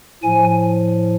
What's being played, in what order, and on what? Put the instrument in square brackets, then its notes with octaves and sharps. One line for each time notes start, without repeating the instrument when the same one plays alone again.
[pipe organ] A2 F3 G#5